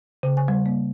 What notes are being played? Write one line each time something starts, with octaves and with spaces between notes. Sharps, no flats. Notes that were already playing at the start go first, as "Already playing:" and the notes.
C#3
G#5
G3
A#3